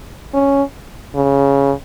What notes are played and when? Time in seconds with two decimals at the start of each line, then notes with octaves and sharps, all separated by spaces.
0.34 C#4
1.15 C#3